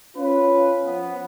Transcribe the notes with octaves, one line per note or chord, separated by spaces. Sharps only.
C#4 F4 B4
F3 B3